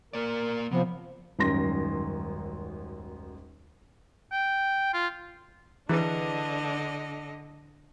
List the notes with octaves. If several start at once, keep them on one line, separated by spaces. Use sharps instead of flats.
A#3 A#4 D5
C3 F3 B3
D#1 G#1 F#2 C6 A#6
G5
F4
D3 E3 D4 E4 G#4 B4 D#5